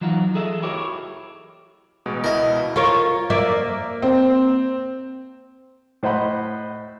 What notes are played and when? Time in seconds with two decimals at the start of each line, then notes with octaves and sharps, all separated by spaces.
0.01 E3 F#3 D#4 F4 F#4
0.35 G#4 A4 D#5 E5
0.62 E4 F#4 G4 A#4 C#5
2.06 A1 B2 G#3
2.24 C#2 B2 E4 A#4 D#5
2.76 F4 A#4 C#5
3.30 A#3 D5 E5
4.02 C4
6.03 A2 C5 D#5 F#5 B5